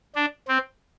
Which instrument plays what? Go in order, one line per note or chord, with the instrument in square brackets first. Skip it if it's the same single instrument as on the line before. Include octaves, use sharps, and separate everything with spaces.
[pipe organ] D4
C4